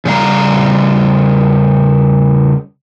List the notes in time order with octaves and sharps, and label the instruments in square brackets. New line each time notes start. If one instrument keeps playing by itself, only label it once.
[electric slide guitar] C#3 G3 F5 A#5